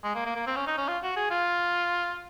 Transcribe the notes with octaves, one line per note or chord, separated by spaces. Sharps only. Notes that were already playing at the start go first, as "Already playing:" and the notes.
G#3
A#3
A#3
A#3
C4
C#4
D#4
C#4
F4
F#4
G#4
F4